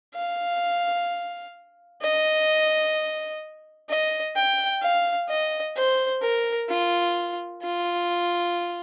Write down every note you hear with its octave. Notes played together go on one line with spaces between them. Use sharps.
F5
D#5
D#5
G5
F5
D#5
C5
A#4
F4
F4